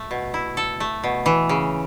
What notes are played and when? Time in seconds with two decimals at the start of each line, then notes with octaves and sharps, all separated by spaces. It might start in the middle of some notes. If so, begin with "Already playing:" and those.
Already playing: A3
0.11 B2
0.34 E4
0.57 A4
0.80 A3
1.04 B2
1.26 E3
1.49 C#3